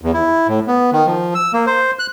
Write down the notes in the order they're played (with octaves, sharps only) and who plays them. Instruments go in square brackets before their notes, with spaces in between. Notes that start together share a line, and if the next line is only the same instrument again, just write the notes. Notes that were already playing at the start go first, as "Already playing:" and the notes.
[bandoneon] E2
E4
A2
B3
D#3
F3
E6
A#3
C5
F#6